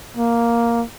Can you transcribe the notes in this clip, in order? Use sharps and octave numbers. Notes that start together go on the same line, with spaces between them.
A#3